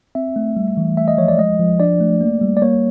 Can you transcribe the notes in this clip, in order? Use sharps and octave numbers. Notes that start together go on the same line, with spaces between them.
C4 E5
A3
G3
E3
A3 E5
D#5
F3 C#5
D5
G#3 D#5
F3
D4 D5
A3
A#3
G3
D5
A#3 C#5